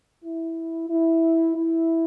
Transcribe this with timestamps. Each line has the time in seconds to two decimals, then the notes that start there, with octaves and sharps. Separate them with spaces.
0.24 E4
0.89 E4
1.55 E4